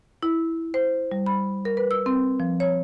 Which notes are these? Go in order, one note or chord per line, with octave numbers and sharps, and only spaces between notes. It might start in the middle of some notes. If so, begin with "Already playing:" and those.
E4
C5
G3
B5
A#4
B4
E6
C4
F3
C#5